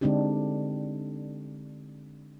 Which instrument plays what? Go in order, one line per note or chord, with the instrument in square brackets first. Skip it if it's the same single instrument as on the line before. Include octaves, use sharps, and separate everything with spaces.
[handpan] D3 G#3 C4 D4 D#4 G4